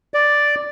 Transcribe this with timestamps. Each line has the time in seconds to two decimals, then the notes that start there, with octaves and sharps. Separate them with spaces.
0.14 D5